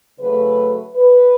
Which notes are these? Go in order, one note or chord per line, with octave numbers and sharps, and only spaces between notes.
C#3 F#3 A3 B4
B4